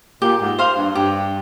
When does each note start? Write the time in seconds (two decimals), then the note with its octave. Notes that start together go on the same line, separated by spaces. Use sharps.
0.22 A#2 G4
0.41 G#2
0.58 C5 F5 C6
0.77 G2
0.95 G2 G4